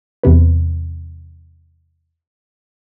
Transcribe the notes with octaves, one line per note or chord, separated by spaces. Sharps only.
E2 C3 B4